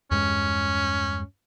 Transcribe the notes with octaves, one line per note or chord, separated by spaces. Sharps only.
E2 G2 G#3 C#4